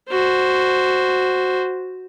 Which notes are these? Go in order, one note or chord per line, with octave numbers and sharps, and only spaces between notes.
F#4 C5